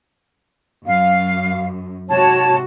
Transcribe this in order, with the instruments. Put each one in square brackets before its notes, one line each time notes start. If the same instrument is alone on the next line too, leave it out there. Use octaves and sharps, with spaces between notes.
[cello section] F#2 [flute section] F5
[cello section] G#2 C3 F#4 [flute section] C#5 A5